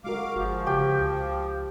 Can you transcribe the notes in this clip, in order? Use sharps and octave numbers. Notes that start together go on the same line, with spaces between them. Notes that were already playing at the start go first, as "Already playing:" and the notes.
G#3 F#4 A#4 F5 D6
G1 F3 F#4 G#4
C#3 G4 G5
C#2